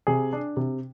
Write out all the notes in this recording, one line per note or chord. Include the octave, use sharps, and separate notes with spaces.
C3 G#4
D4
C3